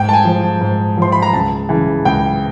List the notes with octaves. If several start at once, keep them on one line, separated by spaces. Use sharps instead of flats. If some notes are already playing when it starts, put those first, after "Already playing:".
Already playing: G#2 G5
A5
G#5
F3
G#2
F3 C6
B5
A#5
C#2 A5
C#3 E3
C#2 G5